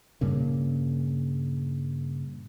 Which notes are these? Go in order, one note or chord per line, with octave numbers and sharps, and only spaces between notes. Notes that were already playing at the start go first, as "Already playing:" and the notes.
G2 A#2 C#3